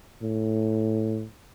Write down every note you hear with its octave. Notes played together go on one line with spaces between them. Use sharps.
A2